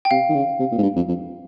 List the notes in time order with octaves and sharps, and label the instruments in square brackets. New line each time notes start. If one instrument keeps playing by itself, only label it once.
[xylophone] G5
[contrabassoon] C3 [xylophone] F5
[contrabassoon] D#3
C#3
C3
A#2
G#2
G2
F2
F2